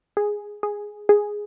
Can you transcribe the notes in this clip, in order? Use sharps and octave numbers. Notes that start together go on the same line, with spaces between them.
G#4
G#4
G#4